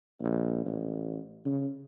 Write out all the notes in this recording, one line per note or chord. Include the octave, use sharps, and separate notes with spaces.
A#1
A1
C#3